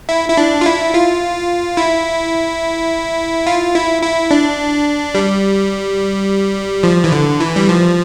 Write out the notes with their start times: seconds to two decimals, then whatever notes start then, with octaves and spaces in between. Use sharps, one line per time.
0.09 E4
0.30 E4
0.37 D4
0.61 F4
0.66 E4
0.94 F4
1.77 E4
3.46 F4
3.75 E4
4.03 E4
4.31 D4
5.15 G3
6.83 F3
7.04 E3
7.12 D3
7.40 E3
7.56 G3
7.69 F3